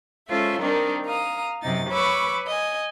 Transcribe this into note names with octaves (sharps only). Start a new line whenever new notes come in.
G#3 C#4 F4 A4 C5 E5
D#3 G3 C4 D4 D#4 A#4
F5 A#5 D#6
F#2 C3 D#4 A6
B4 C#5 B5 C#6 D6 E6
D#5 G#5